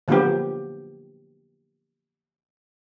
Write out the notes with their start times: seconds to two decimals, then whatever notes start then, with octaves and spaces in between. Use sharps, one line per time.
0.08 D3 F3 F#3 A#3 B3 G4